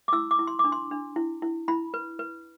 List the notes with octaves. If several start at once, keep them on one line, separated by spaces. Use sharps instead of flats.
D6
E4 E6
D6
E4
C6
D6
D4
C6
D4
E4
E4
E4 B5
B4
B4